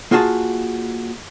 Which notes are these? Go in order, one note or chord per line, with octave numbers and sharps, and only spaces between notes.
A#3 F4 F#4 G#4 A5